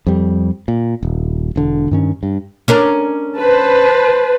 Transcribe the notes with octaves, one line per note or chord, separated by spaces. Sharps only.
F2 G3
A#2
D#1
E1 D3
G2 D#3 C#4
G2
C#4 D4 A#4
B4 C5 A5